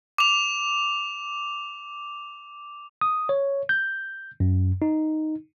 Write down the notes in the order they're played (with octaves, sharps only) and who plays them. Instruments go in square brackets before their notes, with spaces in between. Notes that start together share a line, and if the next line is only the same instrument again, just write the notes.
[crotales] D6 F7
[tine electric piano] D#6
C#5
G6
F#2
D#4